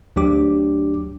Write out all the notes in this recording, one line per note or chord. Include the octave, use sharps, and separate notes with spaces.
D2 F#3 D4 G4 D6